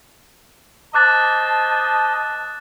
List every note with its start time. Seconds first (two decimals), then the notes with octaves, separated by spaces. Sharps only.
0.94 C5 D#5 A5 D6 F#6 A6